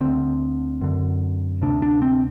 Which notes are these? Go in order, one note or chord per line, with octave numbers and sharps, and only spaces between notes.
D2 D3 C4
F#2 D3
D2 C3 D4
D4
C4